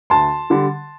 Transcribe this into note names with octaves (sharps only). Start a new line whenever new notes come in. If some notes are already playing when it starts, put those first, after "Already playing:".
D2 A5 C6
D3 G3